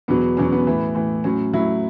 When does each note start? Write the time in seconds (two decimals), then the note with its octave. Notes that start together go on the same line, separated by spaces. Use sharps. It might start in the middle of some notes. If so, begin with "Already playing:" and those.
0.08 E2 B2 F#3 B3
0.37 E2 B2 F#3 C#4
0.52 B3
0.67 A2 E3
0.95 A2 E3
1.24 A2 F#3 C#4
1.53 A2 F#3 E4